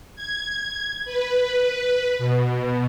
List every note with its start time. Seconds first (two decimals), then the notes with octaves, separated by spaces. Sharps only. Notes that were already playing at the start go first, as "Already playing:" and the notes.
0.15 G#6
1.05 B4
2.18 B2